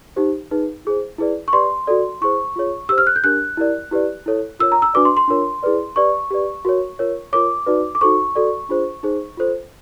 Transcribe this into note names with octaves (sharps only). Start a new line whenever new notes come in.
D#4 G4 C5
D#4 G#4 B4
E4 G#4 C5
E4 G#4 B4 D5
C#6
G4 B4 D5 C6
F#4 A4 D5
E4 G#4 C5 C#6
F4 G#4 C#5
G4 C5 E6
F6
F#6
G6
D4 G4 A#4 F#6
E4 G4 A#4 D5
E4 G4 B4 D5
E4 A4 C#5
F4 A#4 C#5 E6
A#5
E6
D4 F#4 B4 D5 D6
C6
C6
D4 F4 A#4 C#5
E4 G#4 B4 D5
G4 B4 D5 C#6
G4 B4 D5
F#4 A#4 C#5
F4 A#4 C#5
F4 A#4 C#5 D6
D#4 F#4 B4 D5
D6
D#4 F#4 A4 C5 C#6
F#4 A4 D5
D4 F4 G#4 C5
D#4 G#4 C5
F4 A4 C5